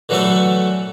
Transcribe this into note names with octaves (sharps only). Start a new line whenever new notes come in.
D3 E3 F#3 A3 F#4 A4